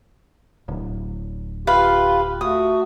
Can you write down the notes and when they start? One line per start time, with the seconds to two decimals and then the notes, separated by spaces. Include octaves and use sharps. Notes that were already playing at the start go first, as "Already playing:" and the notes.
0.68 D1
1.67 F4 G4 B4 F5
2.41 A3 F#4 D#6